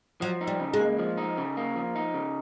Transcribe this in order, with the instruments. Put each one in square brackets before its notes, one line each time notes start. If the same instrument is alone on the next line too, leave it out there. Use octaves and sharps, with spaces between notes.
[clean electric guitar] F3 [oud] F#3
[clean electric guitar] D#4
[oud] G3
[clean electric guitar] C#3
[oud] G#3
[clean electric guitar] A#3
F3
D#4
C#3
A#3
F3
D#4
C#3